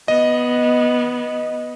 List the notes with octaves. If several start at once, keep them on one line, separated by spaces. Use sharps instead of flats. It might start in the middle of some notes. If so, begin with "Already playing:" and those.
B3 D#5